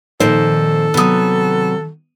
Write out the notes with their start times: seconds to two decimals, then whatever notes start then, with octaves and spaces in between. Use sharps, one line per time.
0.20 F2 A#2 D#3 A4 C5
0.94 C3 F#3 B3 D#6